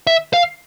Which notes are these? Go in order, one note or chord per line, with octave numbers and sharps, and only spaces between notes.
E5
F5